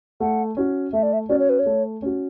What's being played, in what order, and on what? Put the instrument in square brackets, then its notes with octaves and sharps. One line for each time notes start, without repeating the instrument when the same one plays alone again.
[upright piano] A3 [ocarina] F#5
[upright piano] C#4 F#4
[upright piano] A3 [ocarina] E5
[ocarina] D5
E5
[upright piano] C#4 F#4 [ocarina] D5
[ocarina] C#5
B4
C#5
[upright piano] A3
C#4 F#4